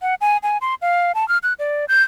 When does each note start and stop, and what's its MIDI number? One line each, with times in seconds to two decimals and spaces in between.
0.02 0.15 78
0.21 0.37 80
0.43 0.58 80
0.61 0.75 84
0.82 1.12 77
1.15 1.27 81
1.28 1.38 89
1.43 1.53 90
1.59 1.85 74
1.88 2.02 91